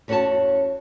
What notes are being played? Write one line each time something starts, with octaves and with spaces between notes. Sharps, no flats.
E2 C#4 F#4 A4 C#5 A5